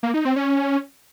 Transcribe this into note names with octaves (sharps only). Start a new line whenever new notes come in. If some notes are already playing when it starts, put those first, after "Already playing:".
A#3
D#4
C4
C#4